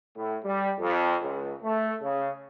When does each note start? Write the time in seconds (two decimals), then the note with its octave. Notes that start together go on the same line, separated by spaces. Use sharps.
0.16 A2
0.45 G3
0.80 F2
1.21 C#2
1.62 A3
2.01 C#3